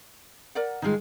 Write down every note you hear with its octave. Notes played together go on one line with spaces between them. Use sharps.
A#4 D5 F#5
D#3 G#3 D#4 F4